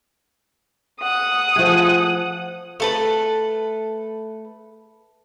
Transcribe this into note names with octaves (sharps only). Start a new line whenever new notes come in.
F#5 D#6
F3 A3 G#4
A3 A4 B4